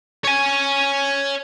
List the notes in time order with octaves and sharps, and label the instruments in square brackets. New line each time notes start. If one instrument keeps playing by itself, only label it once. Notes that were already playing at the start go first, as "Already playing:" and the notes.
[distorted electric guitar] C#5 G#5